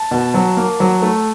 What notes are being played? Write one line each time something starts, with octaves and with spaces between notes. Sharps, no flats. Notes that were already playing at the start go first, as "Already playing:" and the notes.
Already playing: A5
B2
F#3
A#3
F#3
A3